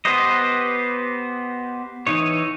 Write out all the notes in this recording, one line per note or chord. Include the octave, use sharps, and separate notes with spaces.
B3 G4 B4 C5 D#5
E3 D#4 C#5